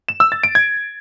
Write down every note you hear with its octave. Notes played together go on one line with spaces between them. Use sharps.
E7
E6
A6
D7
G#6